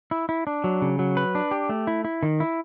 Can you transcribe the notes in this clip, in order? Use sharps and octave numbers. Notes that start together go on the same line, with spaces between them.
E4
E4
D4
F#3
C#3
F#3
B4
D4
G4
A3
E4
E4
D#3
E4